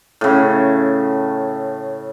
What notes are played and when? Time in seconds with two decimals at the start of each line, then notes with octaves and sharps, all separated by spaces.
0.21 A2 C#3